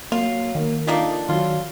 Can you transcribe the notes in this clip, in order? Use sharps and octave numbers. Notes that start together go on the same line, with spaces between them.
F#3 A#3 F4
D#3 A#3
A3 A#3 D4 D#4 F4
D#3 F#3 F4